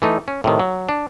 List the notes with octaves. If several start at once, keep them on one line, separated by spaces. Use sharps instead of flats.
E3 A3 D#4
C#4
A2 C3 D#3
F#3
D4